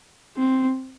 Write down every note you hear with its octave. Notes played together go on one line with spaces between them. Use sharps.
C4